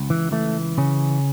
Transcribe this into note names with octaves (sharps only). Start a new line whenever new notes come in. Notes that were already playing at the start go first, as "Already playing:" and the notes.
Already playing: C#2
E3
E3 A3
C#3 C#4